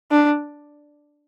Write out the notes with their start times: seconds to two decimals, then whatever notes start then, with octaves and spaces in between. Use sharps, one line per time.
0.11 D4